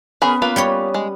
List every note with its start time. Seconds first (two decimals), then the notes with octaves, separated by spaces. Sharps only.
0.22 B3 C#4 G#4 A#4 B5
0.42 A#3 F4 B4
0.56 G3 G4 C#5
0.94 G#3